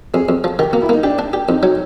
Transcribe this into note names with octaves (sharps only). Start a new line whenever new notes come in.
F2 G#4
F2
F3
D#3 G4
F#4
A#3
E4
A#3 D#4
D4 G4
D4
G4
F2 D#4
F#3